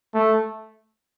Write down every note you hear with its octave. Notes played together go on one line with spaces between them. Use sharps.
A3